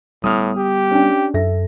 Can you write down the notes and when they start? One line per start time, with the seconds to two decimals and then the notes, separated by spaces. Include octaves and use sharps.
0.24 A2 G3 B3 D#6 F6 F7
0.57 G4
0.91 C#4 D4 G5
1.34 F#2 A4 E5 A#6